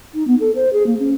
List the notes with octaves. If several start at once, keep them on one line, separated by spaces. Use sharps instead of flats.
D#4
B3
A4
C5
G#4
A#3
C#4